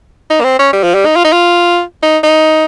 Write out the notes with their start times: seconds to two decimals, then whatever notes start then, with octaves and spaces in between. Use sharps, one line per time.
0.30 D#4
0.41 A#3
0.44 C4
0.59 C#4
0.73 G3
0.83 F3
0.94 G3
1.05 D#4
1.16 F4
1.25 D#4
1.32 F4
2.03 D#4
2.23 D#4